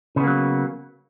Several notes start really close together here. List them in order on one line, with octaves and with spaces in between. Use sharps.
C#3 B3 A#3 F#3